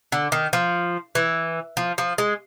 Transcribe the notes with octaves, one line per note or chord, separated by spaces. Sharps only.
D3
D#3
F3
E3
F3
F3
G#3